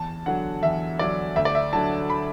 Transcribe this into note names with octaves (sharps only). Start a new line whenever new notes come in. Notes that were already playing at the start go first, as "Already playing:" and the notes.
Already playing: E2 A5
D3 F#3 F#5
E2 E5
D3 F#3 D5
D2 E5
D5
E5
D3 F#3 A5
B5